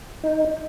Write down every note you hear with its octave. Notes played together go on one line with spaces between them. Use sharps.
D#4